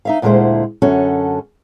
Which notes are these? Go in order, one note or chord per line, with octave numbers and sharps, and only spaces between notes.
D#4 E5 F5
D2 A#2 D3 G#3 E4 C5
F#2 D3 C#4 F#4 A4